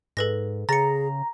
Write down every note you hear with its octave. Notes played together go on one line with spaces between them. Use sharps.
G#2 A4 B4 A#6
C#3 G#4 A#5 A6 C#7